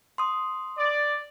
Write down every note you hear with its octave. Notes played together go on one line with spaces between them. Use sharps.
C6 D#6
D5